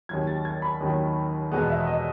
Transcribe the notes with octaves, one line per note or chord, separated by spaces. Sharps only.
D#2 D#3 F#3 G#6
A6
G#6
B5
D#2 D#3 F#3
E2 B2 G#3 B3
E5
D#5